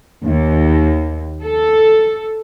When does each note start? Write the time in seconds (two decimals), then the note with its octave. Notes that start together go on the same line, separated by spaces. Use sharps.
0.22 D#2
1.43 A4